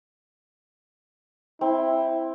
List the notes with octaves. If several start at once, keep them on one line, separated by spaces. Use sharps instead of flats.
C4 E4